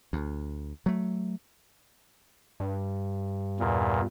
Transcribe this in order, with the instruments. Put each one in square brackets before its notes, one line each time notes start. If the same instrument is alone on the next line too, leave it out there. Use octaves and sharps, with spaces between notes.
[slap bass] D2
F#3 A3
[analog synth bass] G2
[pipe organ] E2 A#2